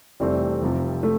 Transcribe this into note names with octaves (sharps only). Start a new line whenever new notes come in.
F1 F2 E3 G3 A3 C4
F1 F2 C3 F3
A3